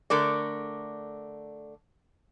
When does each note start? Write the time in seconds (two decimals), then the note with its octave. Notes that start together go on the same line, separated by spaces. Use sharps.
0.10 D3 A3 A#4 D5